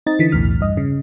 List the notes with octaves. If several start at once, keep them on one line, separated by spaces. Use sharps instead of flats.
C4 D#4 D#5 A6
D3 E3 B6
B1 E2 A2 E3 F6
G2 D#5
C#3